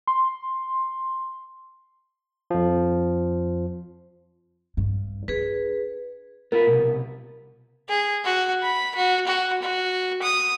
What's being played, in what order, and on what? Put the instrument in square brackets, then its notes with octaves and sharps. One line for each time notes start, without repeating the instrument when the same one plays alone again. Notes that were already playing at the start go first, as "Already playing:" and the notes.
[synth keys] C6
[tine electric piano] F2 F3
[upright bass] G2
[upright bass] D4 [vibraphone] G#4 B4
[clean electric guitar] B3 F4 B4 [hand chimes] A#4
[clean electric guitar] C2 G#2 B2
[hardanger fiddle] G#4
F#4
B5
F#4
F#4
F#4
D#6